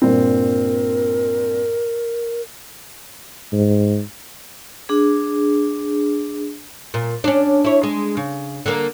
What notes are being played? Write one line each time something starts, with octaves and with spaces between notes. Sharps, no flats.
G2 A#2 C4 A#4
G#2
D4 G#4
A#2
C#4 D4
E4 C#5
G#3
C#3
D3 A#3